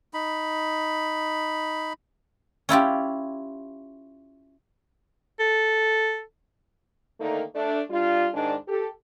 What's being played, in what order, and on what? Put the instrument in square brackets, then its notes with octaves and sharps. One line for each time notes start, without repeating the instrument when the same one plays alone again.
[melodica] D#4 B5
[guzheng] C#4 E4 F4 G4
[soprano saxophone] A4
[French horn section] D3 D#3 A3 A#3 D#4
A3 D4
G3 D4 F4
G#2 D#3 G#3 D4
G4 A4